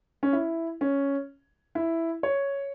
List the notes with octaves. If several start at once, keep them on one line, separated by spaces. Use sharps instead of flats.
C#4
E4
C#4
E4
C#5